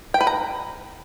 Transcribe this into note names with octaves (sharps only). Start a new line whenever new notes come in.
G5
B4
A#5